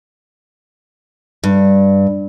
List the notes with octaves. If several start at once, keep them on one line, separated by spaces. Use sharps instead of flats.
G2